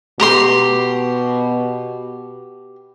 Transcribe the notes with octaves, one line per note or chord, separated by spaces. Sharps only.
B2 G4 A#5 C6